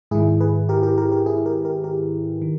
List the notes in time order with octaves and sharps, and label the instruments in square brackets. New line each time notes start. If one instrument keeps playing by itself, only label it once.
[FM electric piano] G#2 D#3 E4 G#4
G#4 B4
G4 A#4
G4 A#4
G4 A#4
G4 A#4
E4 G#4
G4 A#4
G4 A#4
G4 A#4
D#3